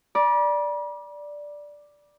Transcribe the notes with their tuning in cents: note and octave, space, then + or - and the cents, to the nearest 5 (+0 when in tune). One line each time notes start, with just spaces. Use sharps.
D5 +0 B5 -45